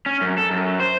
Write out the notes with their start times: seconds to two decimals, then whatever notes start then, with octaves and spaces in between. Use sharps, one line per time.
0.06 C#4
0.21 F#2
0.38 A4
0.51 F#2
0.80 C5